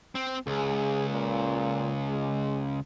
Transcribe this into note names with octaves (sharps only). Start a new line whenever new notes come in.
C4
C#2 G#4
A#2
G#3